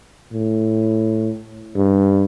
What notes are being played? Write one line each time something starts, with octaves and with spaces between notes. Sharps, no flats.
A2
G2